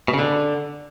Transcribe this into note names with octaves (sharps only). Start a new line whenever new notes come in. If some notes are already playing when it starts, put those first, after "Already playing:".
B2
C#3
D3